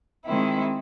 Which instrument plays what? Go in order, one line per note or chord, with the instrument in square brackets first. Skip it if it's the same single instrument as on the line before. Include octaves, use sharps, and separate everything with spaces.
[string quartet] D#3 G#3 C4 E4